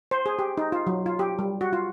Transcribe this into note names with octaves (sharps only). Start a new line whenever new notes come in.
C5
G#4
G4
D#4
F4
F#3
F4
G4
G3
F#4
F4